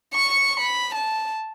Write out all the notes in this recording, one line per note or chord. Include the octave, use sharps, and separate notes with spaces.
C#6 C#7
B5
A5